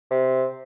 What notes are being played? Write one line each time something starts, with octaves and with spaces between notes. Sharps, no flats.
C3